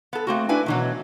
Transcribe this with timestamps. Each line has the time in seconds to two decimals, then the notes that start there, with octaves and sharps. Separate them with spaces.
0.13 B3 A4
0.27 A3 A#3 C4 F#4
0.49 D4 E4 B4 G#5
0.66 B2 D#3 E3 F#3